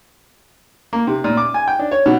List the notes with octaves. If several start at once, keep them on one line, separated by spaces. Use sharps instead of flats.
A#3
C3
A#2
D6
G#5
G5
D4
C#5
B2